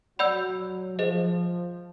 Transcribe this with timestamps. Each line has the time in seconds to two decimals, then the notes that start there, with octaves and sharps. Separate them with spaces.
0.19 F#3 D5 F#5 B5 E6 G6
0.99 F3 G#4 C5 D#5